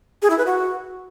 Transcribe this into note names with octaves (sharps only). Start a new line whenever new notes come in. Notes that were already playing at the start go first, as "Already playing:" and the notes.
G#4
E4
B4
F#4